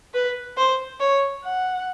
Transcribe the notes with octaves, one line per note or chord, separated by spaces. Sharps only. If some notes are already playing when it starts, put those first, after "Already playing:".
B4
C5
C#5
F#5